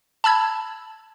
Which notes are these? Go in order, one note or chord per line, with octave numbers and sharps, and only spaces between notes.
A5 B5 E6 G#6